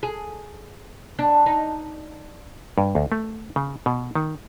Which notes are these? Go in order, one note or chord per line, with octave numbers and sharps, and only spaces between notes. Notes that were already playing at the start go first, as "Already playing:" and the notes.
G#4
D4
D#4
G2
D2
A3
C#3
B2
D#3